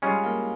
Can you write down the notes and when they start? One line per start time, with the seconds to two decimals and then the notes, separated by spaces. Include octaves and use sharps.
0.02 G3 G#3 C#4 F4
0.23 A#3